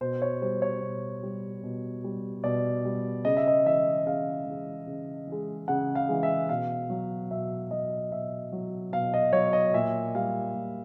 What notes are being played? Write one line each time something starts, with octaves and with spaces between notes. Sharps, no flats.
B2 C5
C#5
G3 C5
C#5
B2
G3
B2
G3
B2 D5
G3
C#3 D#5
E5
D#5
E3 G#3 E5
C#3 F5
E3 G#3
C#3
E3 G#3
C#3 F#5
F5
E3 G#3
E5
B2 F5
F#3
B2 E5
F#3 D#5
B2 E5
F#3
B2 F5
D#5
F#3 C#5
D#5
A#2 E5
G3 F5
A#2